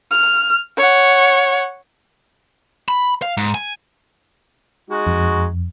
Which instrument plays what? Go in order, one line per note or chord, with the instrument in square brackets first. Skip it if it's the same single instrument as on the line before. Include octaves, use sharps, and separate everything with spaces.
[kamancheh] F6
C#5 F#5
[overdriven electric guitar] B5
F5
G#2
G#5
[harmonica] G#3 D#4 F#4
[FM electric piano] F2